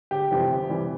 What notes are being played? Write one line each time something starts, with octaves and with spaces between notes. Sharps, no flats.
G1 G4
F2 C3 E3 G3
G1
C3 E3 G3